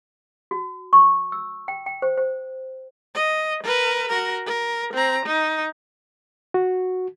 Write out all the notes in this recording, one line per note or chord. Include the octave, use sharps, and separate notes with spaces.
F#4
C#6
E6
G5
G5
C5
C5
D#5
A#4 B4
F#4 A#4
A#4
C4 A#5
D#4
F#4